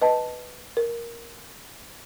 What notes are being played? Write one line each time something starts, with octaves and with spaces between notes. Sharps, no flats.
B4 D#5 A5
A#4